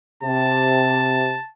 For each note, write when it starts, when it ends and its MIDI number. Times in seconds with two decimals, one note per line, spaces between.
0.23 1.36 48
0.23 1.50 81